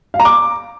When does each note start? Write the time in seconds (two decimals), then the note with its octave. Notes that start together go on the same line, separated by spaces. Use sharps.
0.14 F5
0.20 A#5
0.25 D6